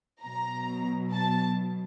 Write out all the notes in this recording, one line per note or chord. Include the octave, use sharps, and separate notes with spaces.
B2 F#3 A#5
A5